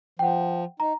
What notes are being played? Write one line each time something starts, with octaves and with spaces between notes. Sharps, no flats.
F3 F#5 G5
D#4 A#5